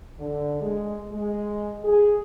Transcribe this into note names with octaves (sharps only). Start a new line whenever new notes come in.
D3
G#3
G#3
G#4